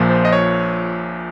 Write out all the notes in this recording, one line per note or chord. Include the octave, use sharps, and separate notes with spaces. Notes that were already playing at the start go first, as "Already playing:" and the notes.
Already playing: A#1 A#2 F3
C5
D#5
C#5